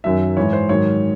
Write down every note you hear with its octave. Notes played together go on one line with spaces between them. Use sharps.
F#2 D#3 F#3 E5
G#2 E3 C#5
C5
G#2 D#3 F#3 C#5